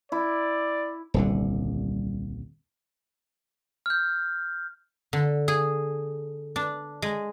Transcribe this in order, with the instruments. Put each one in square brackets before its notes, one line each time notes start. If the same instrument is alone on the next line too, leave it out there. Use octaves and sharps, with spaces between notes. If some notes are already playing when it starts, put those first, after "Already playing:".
[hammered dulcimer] E4 [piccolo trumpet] D5
[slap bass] D#1 C2 D3
[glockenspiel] F6 G6
[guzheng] D3
G#4
D4
G#3